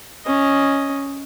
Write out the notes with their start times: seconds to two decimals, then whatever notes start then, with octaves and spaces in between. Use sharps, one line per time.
0.25 C#4 D#5